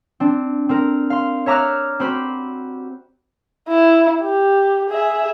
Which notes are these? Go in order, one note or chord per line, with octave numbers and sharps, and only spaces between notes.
C4 D4
C4 A#4
F5 C6
C#5 E5 A#5 D6 F6 F#6
C4 F#4 G4 C5 B5
E4
G4
G#4 E5